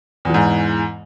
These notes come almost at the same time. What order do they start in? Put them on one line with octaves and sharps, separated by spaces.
E2 E3 G#2